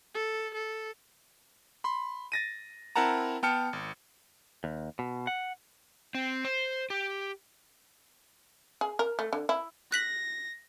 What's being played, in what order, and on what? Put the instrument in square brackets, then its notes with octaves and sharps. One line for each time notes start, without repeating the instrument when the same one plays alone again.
[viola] A4
A4
[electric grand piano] B5 C6
A6 A#6 D#7
C4 E4 A#4 F#5 A5 A#5
B3 G5 A5 F6 C#7
G#1
[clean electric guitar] D#2
B2
F#5
[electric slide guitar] C4
C5
G4
[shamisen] G#4
A#4
A3
D3
E4
[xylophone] F#6 B6 F#7 [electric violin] A#6